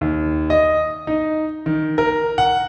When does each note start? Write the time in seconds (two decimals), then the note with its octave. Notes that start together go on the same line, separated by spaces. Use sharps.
0.01 D#2
0.50 D#5
1.07 D#4
1.66 D#3
1.98 A#4
2.38 F#5